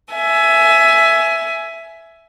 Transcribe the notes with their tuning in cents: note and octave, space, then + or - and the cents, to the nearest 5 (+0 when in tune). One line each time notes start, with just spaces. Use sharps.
E5 +10 G#5 +20